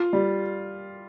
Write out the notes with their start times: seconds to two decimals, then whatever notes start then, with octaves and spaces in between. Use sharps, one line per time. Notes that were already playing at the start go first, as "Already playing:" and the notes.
Already playing: F4
0.13 G3